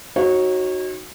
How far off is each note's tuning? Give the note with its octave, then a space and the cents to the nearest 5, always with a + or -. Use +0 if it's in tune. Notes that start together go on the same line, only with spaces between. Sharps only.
D#4 +0 F#4 +0 C#5 -35